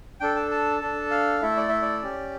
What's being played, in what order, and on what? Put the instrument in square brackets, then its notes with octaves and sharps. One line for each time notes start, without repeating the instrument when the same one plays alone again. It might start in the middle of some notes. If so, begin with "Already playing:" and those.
[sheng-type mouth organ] D4 A4 G5
A5
A5
D4 A4
F5
A3 E4 A4 E5
D5
E5
D5
C#4 G4